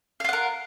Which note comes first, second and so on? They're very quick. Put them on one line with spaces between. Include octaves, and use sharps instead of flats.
F5 F4 F#5 A#4